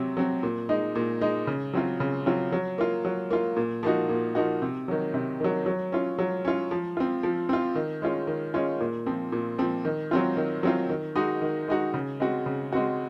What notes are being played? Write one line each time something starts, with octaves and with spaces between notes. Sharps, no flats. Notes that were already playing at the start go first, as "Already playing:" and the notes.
Already playing: C3 F#3 C4
F#3 C4
A#2
G#3 D#4
A#2
G#3 D#4
C#3
F#3 C4 F4
C#3
F#3 C4 F4
F#3
A#3 F4
F#3
A#3 F4
A#2
F3 A#3 D#4 F#4
A#2
F3 A#3 D#4 F#4
C3
D#3 F#3
C3
D#3 F#3
F#3
C#4 F4
F#3
C#4 F4
F3
C4 F4
F3
C4 F4
D#3
G#3 C#4 F4
D#3
G#3 C#4 F4
A#2
F3 C4
A#2
F3 C4
D#3
F#3 C4 F4
D#3
F#3 C4 F4
D#3
G#3 D#4 F#4
D#3
G#3 D#4 F#4
C#3
G#3 C4 F#4
C#3
G#3 C4 F#4